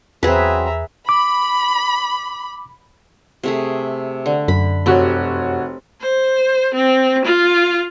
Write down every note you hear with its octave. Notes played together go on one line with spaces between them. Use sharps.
E2 F#3 C4 G#4 B4 E5 A#5
B5 D6
C3 A3 G#4
D3
F#2 B5
F1 C4 F#4 G4 C#5
C5
C4
F4